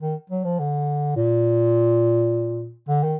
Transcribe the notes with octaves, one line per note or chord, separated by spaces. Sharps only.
D#3
F#3
F3
D3
A#2
D3
D#3